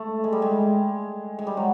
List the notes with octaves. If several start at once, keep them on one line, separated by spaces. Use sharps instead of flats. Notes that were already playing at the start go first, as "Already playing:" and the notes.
Already playing: A3
G#3
G3
G#3
G#3
G3
F#3